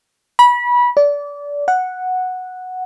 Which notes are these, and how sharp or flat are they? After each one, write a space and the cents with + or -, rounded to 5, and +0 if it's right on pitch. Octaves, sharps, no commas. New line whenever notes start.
B5 -25
D5 -25
F#5 -5